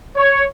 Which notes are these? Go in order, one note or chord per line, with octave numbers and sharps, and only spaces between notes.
C#5